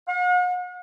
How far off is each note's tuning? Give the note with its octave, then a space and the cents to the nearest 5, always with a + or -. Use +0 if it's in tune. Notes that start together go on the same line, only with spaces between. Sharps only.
F#5 -45